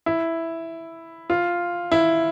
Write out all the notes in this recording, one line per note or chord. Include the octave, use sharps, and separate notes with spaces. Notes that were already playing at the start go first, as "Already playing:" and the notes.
E4
F4
E4